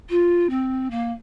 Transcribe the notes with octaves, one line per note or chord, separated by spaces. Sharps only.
F4
C4
A#3